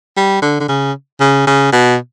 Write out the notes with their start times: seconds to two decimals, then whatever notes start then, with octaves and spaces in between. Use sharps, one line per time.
0.17 G3
0.42 D3
0.60 D3
0.69 C#3
1.20 C#3
1.47 C#3
1.72 B2